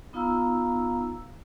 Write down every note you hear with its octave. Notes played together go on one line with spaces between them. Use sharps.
B3 D#4 F4 F5 A#5 E6